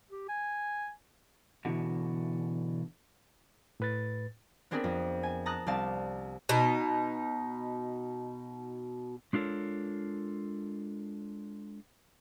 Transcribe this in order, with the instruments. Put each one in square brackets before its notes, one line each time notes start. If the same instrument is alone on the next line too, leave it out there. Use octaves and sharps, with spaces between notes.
[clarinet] G4
G#5
[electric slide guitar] B2 D3 E3 F#4
[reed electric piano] A2 B4 A6
[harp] B3 C4 D4 G#4 A#4 B4
F2
G#5
A5 A#5 D#6 F#6
C2 C4 D5 F5 A5 A6
[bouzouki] B2 D#4
[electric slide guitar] G#3 D4 F4 A4 A#4 C#5